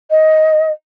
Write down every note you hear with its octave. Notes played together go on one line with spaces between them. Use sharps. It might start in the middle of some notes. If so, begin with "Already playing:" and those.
D#5